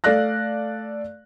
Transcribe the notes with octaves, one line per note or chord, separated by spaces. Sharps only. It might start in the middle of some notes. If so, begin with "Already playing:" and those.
A3 A4 D5 F5 F#6 A#6